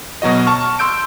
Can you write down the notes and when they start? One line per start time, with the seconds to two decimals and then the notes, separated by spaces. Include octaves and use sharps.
0.22 B2 F#3 F#4 D#5
0.46 A5 C#6 F6
0.79 C6 E6 G6 D7